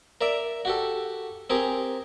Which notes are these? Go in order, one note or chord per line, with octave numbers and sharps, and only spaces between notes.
A#4 D5 E5
F#4 G4 A4
C4 G4 G#4 A#4